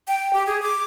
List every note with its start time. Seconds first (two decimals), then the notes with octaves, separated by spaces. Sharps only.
0.08 G5
0.33 G4
0.46 G#4
0.62 D6